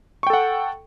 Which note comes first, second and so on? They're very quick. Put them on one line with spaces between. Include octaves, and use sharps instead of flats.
C#6 G5 A4 F#5